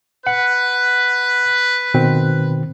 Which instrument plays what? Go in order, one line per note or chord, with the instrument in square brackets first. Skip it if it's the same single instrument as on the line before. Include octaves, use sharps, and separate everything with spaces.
[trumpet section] B4 [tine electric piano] F#5
[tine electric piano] B2 D#3 C4